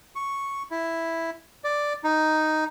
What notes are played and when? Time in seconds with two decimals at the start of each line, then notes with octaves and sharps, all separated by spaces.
0.15 C#6
0.71 E4
1.64 D5
2.04 D#4